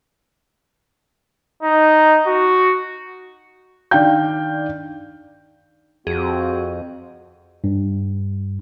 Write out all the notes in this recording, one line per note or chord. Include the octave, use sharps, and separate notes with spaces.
D#4
F#4
D#3 D4 D5 F5 G5 G6
F2 C4 F#4 G#4
G2